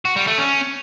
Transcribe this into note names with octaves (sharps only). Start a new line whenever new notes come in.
F#4
G3
A3
C#4